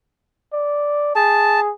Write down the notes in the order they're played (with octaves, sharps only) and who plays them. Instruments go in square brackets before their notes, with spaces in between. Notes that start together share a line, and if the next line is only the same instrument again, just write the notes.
[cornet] D5
[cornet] G#4 [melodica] A5